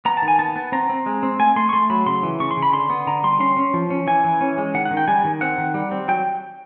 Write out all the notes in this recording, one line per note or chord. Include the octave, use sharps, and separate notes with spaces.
B3 A#5
A5
D#3
G#5
B3 A5
B3
C4 A#5
C4
G#3
C4
A3 G#5
A3 C6
C#6
A3 C6
F#3 B5
C#3 C6
E3
C#3 C#6
C6
C#3
B5
D3 C6
B3
D3 A#5
G3 C6
C#4 C6
C#4
F3
C#4
E3 G#5
E3
C#4
G#3
D#3 F#5
F#5
D#3
G5
G3 G#5
D#3
C4 F#5
D#3
G3
C4
F#3 G5